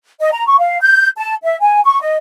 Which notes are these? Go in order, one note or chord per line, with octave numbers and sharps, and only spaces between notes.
D#5
A#5
C#6
F5
G6
A5
E5
G#5
C#6
D#5